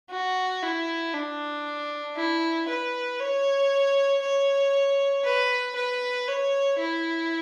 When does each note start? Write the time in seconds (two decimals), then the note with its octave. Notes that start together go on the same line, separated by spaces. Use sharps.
0.11 F#4
0.63 E4
1.14 D4
2.16 E4
2.68 B4
3.20 C#5
4.22 C#5
5.24 B4
5.75 B4
6.27 C#5
6.79 E4